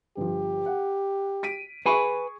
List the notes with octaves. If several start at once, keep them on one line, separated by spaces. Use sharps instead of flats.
G1 F3 G4
F#5
B6 D7 D#7
G#4 B4 G#5 B5 C#6